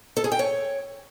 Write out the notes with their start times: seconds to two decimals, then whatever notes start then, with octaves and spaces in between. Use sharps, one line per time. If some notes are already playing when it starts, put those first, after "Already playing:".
0.17 A4
0.24 G#4
0.32 G5
0.39 C#5